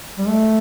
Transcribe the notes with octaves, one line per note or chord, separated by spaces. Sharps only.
G3
A3